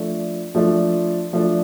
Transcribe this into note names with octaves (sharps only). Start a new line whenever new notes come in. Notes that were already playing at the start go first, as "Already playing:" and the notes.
Already playing: F3 A3 D4
F3 A3 D4
F3 A3 D4